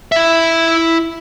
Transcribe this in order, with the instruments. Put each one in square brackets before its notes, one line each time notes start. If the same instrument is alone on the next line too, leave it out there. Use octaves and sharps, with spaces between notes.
[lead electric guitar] E4 E5